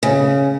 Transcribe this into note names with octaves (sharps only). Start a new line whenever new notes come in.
C#3